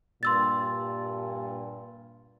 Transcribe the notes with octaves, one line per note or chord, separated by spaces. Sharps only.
G2 A#2 C6 E6 A6